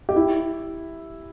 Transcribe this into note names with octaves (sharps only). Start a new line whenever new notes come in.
G4
E4